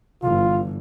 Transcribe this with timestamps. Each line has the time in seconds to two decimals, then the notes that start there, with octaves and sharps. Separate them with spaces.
0.23 G1 E3 F4